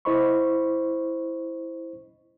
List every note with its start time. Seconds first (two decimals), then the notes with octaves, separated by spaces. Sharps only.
0.05 E4 C5 D#5 B5 C#6